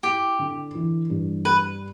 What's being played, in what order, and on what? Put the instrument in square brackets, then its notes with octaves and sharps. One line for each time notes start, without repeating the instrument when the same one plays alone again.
[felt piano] E4 [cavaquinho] G4
[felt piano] D3
E3
G2
[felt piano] G4 [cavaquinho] B4